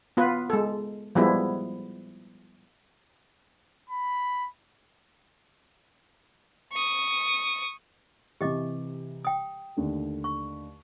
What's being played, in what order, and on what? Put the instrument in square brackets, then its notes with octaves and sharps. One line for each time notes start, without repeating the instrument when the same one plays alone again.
[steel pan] B3 F4 B4
G#3 A4
F3 G3 G#3 B3 E4
[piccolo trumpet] B5
[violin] C#6 D#6
[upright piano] C3 E3 [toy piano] G4 D#5 D6
[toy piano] G5 D#6
[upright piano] D#2 D3 A3
[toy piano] C#6